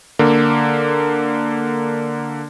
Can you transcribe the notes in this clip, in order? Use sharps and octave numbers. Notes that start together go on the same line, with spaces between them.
D3 A#3